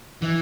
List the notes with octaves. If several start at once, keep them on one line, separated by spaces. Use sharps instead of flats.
E3